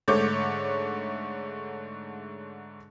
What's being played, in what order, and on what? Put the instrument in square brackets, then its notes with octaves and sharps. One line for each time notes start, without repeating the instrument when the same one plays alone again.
[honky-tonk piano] G#2 D3 A3 C#5 D6 G6